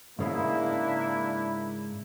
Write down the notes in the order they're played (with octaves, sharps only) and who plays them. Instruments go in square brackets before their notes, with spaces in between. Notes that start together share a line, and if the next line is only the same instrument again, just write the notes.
[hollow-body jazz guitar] G#2 C#3 G#3 [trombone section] A#3 D4 E4